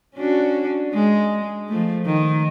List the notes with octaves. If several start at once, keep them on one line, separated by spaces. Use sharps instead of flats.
C#4 D4 F#4
G#3
F3 A3
D#3